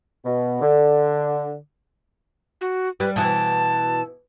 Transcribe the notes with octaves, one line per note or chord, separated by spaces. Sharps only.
B2
D3
F#4
G3 B4
B2 E3 A5